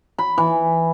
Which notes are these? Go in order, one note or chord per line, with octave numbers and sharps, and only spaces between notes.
B5
E3